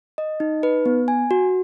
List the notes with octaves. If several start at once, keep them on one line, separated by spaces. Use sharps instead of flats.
D#5
D#4
B4
B3
G#5
F#4